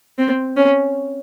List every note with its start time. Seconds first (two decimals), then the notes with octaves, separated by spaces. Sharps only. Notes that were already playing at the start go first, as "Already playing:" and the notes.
0.18 C4
0.56 C#4